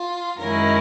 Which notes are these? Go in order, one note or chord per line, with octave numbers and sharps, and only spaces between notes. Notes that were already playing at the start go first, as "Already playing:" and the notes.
Already playing: F4
F#2 D#3 G#3 C#4 E4 A#4